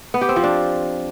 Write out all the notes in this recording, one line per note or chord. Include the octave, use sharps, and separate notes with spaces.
B3
G4
C4
F3
D4